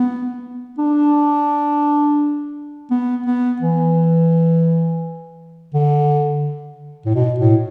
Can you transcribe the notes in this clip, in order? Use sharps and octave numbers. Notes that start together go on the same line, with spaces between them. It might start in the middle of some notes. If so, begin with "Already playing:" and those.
Already playing: B3
D4
B3
B3
E3
D3
A2
B2
A2